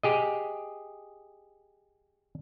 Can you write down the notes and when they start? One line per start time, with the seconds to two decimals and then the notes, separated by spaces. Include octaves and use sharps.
0.03 G4 G#4 D#5